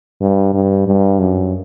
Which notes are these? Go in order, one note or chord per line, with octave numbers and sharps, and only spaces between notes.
G2
G2
G2
F#2